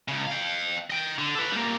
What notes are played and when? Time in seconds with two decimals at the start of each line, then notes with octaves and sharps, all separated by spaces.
0.08 C#2 C#3
0.27 F5 G5
0.90 D#5 G5
1.19 D3
1.35 A4 B4
1.52 G3 A#3